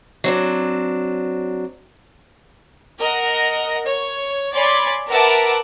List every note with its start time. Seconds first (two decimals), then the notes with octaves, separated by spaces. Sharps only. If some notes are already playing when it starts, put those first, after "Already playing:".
0.24 F#3 C4 D4
2.99 A#4 D#5 F#5
3.86 C#5
4.54 C#5 D5 G#5 B5 C6
5.09 A#4 B4 E5 F#5 A5 D6